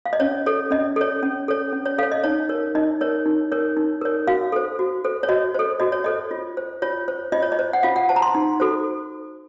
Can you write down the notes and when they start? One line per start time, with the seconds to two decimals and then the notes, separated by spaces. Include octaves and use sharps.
0.06 F5
0.13 D#5
0.20 C#4 C#5
0.46 A4 C#5
0.71 C#4 D#5
0.96 A4 C#5
1.23 C#4
1.48 A4 C#5
1.72 C#4
1.85 C#5
1.98 A4 C#5 F5
2.12 D#5
2.24 D#4 C#5
2.49 A#4 C#5
2.75 D#4 D#5
3.01 A#4 C#5
3.26 D#4
3.52 A#4 C#5
3.77 D#4
4.01 A#4 C#5
4.28 F#4 F5
4.52 A4 C5
4.79 F#4
5.04 A4 C5
5.23 C#5
5.29 F#4 D#5
5.54 A4 C5
5.80 F#4 D#5
5.92 C#5
6.04 A4 C5 D#5
6.31 F4
6.57 C5
6.82 F4 C#5
7.08 C5
7.32 F4 D#5
7.42 C#5
7.52 D#5
7.59 C5
7.73 F#5
7.83 F4 F5
7.96 F#5
8.09 C5 A5
8.16 A#5
8.22 C6
8.35 D#4
8.60 F#4 A4 C5